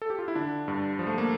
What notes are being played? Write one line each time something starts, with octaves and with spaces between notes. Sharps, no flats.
A4
G4
F4
E4
D3 D4
G2
F3
A3
A#3